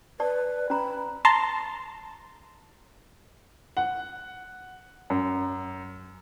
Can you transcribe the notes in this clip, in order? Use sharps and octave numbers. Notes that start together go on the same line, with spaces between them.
B4 D5 A5
C#4 A#5 B5
A5 A#5 C6
F#5
F#2